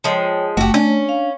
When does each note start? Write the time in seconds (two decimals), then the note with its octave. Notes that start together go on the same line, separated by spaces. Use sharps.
0.04 F3 G#3 C#5 G5
0.57 F#1 A3 F#4 G4
0.74 C#4 D4
1.09 F5